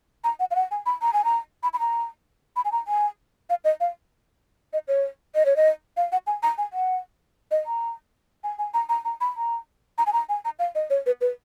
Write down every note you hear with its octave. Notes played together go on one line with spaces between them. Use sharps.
A#5
F#5
F5
F#5
G#5
B5
A#5
G#5
A#5
B5
B5
A#5
B5
G#5
A#5
G#5
F5
D#5
F5
D#5
C#5
D#5
C#5
D#5
F5
F#5
G#5
A#5
G#5
F#5
D#5
A#5
G#5
G#5
A#5
A#5
A#5
B5
A#5
A#5
G#5
A#5
G#5
A#5
F5
D#5
C#5
B4
B4